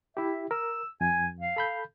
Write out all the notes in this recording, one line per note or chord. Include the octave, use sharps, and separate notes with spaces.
E4 G4 E5
A#4 E6
F2 G#5
F5
A4 B5 G6